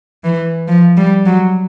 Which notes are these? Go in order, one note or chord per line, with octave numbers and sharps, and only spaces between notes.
E3
F3
G3
F#3